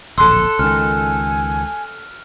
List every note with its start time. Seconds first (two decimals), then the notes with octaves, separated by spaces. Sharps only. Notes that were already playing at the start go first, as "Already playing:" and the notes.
0.18 D1 A#1 A4 C6 E6 F#6
0.59 C#2 D#3 G#5 F6